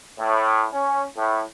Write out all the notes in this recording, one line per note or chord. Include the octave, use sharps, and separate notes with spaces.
A2
C#4
A2